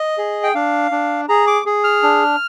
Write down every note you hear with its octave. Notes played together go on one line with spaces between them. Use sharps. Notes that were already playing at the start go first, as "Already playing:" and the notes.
Already playing: D#5
G#4
G5
D4 F5
D4
G#4 A#5
D6
G#4
F6
D4